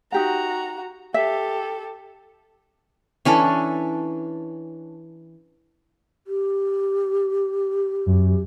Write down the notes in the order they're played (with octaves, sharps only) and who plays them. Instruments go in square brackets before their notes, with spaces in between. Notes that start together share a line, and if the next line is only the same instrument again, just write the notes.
[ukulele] D#4 G4 F#5 [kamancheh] F#4 A#5
[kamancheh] G4 A4 [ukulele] E5
[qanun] E3 C#4 D4 A4
[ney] G4
[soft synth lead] F#2